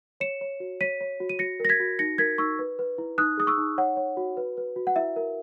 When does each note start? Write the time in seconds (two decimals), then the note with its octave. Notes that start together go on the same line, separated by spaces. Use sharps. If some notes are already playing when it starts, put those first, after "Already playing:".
0.20 C#5 C#7 E7
0.41 C#5
0.60 F#4
0.81 C#5 B6 D#7
1.01 C#5
1.20 F#4
1.29 D#7
1.39 F#4 A#6 C#7
1.60 A#4 A#6
1.69 G#6 B6
1.80 F#4
1.99 D#4 A#6 C#7
2.18 A#4 G#6 B6
2.38 D#4 C#6 E6
2.59 B4
2.79 B4
2.98 E4
3.18 D#4 D#6 F#6
3.37 G#4 D#6
3.47 C#6 E6
3.58 D#4
3.78 C#5 F#5
3.97 C#5
4.17 F#4
4.37 B4
4.57 B4
4.76 F#4
4.87 F#5
4.96 E4 E5
5.16 A#4